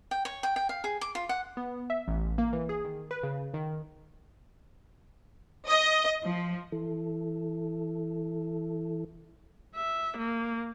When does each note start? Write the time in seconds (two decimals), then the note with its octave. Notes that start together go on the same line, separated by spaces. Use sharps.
0.11 G5
0.25 C#5
0.43 G5
0.56 G5
0.69 F5
0.84 G#4
1.01 D6
1.15 F4
1.29 F#5
1.57 B3
1.90 E5
2.08 A1
2.38 A#3
2.53 E3
2.69 G#4
2.85 D#3
3.11 B4
3.23 C#3
3.54 D#3
5.68 D#5
6.25 F3
6.72 E3 E4 A4
9.75 E5
10.17 A#3